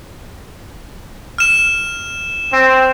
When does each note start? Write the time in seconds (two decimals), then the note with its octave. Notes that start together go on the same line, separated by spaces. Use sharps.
1.38 F6 E7
2.53 C4